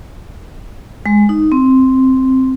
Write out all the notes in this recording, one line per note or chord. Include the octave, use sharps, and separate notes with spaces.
G#3
D#4
C4